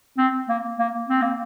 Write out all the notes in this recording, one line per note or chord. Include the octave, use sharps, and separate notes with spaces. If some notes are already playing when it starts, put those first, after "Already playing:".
C4
A#3
A#3
C4
A#3